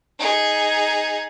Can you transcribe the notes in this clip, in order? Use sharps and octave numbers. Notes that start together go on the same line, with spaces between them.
D#4 G#4